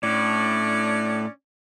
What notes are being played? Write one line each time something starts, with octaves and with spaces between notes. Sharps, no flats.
A2 C#4 D4 D5